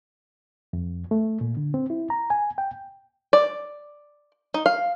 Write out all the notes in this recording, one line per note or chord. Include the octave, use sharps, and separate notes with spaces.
F2
A3
A#2
D3
C4
E4
A#5
G#5
G5
D5
D#4
F5